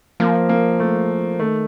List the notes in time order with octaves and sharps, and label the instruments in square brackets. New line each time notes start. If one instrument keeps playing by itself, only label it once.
[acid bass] F3 [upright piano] A#3
[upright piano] A#3
A3
[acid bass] D#3 [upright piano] A3